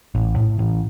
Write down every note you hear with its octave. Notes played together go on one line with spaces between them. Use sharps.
A1
A2
A1